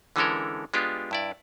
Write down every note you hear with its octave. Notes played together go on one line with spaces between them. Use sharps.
D3 E3 G#3 C#4 A4 A#4
G#3 B3 D4 F4 G4
G2 E4 D5